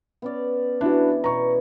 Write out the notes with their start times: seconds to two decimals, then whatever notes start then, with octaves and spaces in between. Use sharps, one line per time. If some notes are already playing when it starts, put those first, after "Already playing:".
0.22 B3 C#4 D5
0.81 E3 D4 E4 F#4
1.24 B2 A#5 C#6